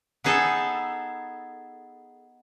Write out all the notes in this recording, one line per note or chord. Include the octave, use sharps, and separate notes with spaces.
B3 D#4 G#4 A4